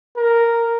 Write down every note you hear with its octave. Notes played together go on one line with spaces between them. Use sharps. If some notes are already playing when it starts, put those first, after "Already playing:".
A#4